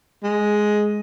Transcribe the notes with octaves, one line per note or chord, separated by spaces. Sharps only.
G#3